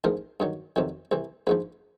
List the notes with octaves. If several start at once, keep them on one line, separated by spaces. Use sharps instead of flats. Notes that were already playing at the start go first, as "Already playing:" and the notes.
A1 G#2 F3 A#4
G2 D#3 F#3
F2 C3 D#3 F#3
C2 C3 E3
A#1 G#2 F3 B4